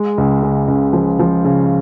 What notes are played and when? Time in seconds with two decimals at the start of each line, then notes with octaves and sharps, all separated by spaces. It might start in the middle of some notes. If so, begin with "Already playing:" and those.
Already playing: G#3
0.18 C#2
0.43 C#3
0.68 C#2
0.93 F3
1.19 F3
1.45 C#3